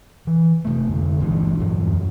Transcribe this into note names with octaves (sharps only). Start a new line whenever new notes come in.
E3
C3 A3
F2 D3 G#3
G1 A#2 E3 D4
E2 G2 E3 F#3
F#2